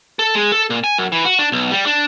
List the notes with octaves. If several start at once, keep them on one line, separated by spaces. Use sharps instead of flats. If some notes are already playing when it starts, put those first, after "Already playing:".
A4
G#3
A4
A#2
G#5
F#2
E3
F#4
D4
B1
G3
D4